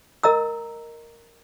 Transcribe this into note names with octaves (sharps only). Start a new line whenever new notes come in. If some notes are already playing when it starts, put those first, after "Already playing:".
A#4 D#5 A#5 E6